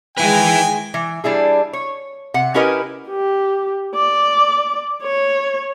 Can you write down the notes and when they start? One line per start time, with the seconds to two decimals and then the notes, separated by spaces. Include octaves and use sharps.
0.17 D#3 G#3 E4 B4 G5 G#5
0.94 E3
1.24 G3 D4 E4 G#4
1.73 C#5
2.34 C3 F#5
2.54 C#4 E4 G4 A#4 B4 D#5
3.09 G4
3.95 D5
5.03 C#5